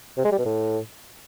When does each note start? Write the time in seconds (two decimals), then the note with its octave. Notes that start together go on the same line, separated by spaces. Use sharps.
0.18 C3
0.25 G#3
0.32 G3
0.39 B2
0.46 A2